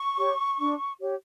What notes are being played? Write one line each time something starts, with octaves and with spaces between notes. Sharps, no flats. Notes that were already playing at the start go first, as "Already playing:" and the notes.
Already playing: C#6
G4 C#5
D4
G4 C#5